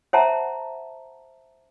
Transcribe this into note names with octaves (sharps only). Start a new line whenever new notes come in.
C5 E5 F#5 A5 A#5